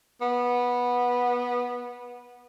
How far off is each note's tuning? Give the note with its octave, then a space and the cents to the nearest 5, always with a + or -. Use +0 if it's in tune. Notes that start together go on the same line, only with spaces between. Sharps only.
B3 -15